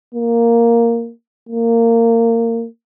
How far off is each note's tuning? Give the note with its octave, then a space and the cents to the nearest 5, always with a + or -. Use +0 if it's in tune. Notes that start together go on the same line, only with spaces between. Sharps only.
A#3 -5
A#3 -20